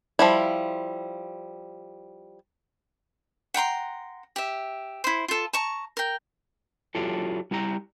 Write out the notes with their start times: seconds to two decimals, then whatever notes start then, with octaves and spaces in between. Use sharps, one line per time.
0.19 F3 G3 E4
3.54 F#5 G5 A#5 C6
4.36 G4 E5
5.04 E4 C5
5.28 F4 A4
5.53 A5 A#5 C#6
5.97 A#4 G5
6.95 F#3 E4 F4 G4 A4
7.51 G3 E4 G4 A#5